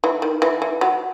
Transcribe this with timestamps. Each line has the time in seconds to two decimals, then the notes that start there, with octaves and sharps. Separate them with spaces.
0.04 E3
0.22 D#3
0.42 E3
0.62 E3
0.81 F#3